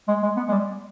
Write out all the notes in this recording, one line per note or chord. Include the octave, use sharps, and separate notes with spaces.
G#3
G#3
B3
G#3
G3